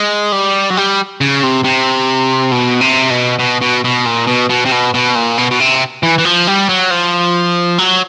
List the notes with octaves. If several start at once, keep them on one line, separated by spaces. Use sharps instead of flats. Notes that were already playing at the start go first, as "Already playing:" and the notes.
Already playing: G#3
G3
F#3
G3
C#3
C3
C3
B2
C3
B2
B2
B2
B2
A#2
B2
B2
C3
B2
B2
A#2
B2
B2
C3
E3
E3
F3
G3
F#3
F3
F#3